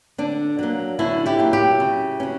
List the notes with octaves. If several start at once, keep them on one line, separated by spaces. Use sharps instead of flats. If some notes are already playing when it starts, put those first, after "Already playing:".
D3 D4
F#3 A#3
D3 C#4 E4
E4 G4
F#3 A#3
E4 G4
C#3
F#3 C#4